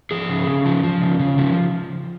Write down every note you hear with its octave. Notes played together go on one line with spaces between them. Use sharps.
F3 G#4
C#3
C#3
F3
F3
C#3
C#3
F3